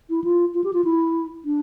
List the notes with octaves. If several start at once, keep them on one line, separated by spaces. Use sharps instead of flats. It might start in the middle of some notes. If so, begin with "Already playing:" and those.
E4
F4
F4
G4
F4
E4
D4